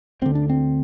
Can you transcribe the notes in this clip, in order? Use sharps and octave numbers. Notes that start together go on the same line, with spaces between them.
D2 D3 C4
D4
C4